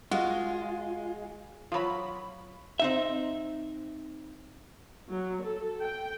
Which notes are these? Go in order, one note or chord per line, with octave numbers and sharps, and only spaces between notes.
G#3 F4 F#4 D#5 F5
F3 F#3 F4 B5
C4 D#4 E5
F#3
A4
G5